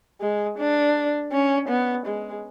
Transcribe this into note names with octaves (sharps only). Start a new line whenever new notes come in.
G#3
D4
C#4
B3
G#3